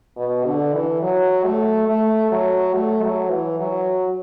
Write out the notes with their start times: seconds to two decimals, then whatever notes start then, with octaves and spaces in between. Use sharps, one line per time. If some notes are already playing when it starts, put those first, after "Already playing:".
0.17 B2
0.46 D3
0.73 E3
1.02 F#3
1.45 A3
1.88 A3
2.31 F#3
2.74 A3
3.03 F#3
3.30 E3
3.60 F#3